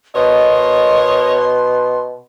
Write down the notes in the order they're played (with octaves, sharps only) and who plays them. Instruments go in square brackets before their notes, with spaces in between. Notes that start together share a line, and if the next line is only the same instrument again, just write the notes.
[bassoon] B2 [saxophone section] A#4 C#5 D#5 [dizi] C6